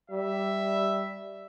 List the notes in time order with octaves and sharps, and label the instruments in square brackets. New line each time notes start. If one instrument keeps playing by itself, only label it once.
[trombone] G3 [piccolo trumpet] E5